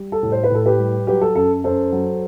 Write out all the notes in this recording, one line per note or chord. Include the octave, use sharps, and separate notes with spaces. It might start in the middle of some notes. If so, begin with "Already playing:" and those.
Already playing: G3
A4
A2
C5
B4
A2 A4
G4 B4
G3
F#3 G4 B4
A4
F#2 A4
F#2 A4 C5
F#3